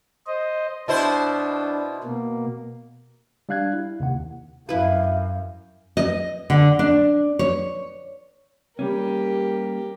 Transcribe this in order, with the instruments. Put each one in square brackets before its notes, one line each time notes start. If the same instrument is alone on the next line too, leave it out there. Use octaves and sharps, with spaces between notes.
[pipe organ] C5 D#5
[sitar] B2 E4 C5 [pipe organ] D4
[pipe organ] B2 A#3
[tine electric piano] G3 D4 F5 F#6 G#6
E4
D#2 C3 F#5
[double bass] F#2 [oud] E4 B4 [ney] F5
[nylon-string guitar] D#5
D3
D4
C#5
[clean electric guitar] G3 A#3 C#4 [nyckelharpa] G4 A#4